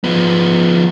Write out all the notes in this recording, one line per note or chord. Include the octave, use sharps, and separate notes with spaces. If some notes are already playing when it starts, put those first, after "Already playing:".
F3 B3